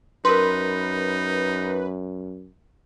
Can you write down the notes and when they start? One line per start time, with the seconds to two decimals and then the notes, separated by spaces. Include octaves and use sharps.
0.25 F#2 D#4 A#4 B4 C6